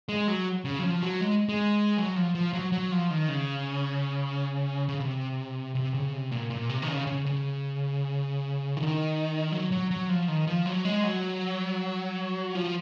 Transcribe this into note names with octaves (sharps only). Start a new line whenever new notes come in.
G#3
F#3
C#3
F#3
F3
F#3
G#3
G#3
F#3
F3
F3
F#3
F#3
F3
D#3
C#3
C#3
C3
C3
C#3
C3
A#2
A#2
C3
D#3
C#3
C#3
C#3
D#3
F#3
F#3
F#3
F3
D#3
F3
F#3
G#3
F#3
F3